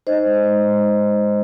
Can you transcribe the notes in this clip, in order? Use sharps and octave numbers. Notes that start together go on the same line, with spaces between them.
D#4 C5 D#5
G#3
G#3
G#3
D#4